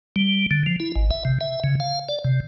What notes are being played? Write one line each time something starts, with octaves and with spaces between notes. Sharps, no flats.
G3
D3
F3
E4
G#1
E5
C3
E5
C#3
F5
D5
C3